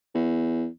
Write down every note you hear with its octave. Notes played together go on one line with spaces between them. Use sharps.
E2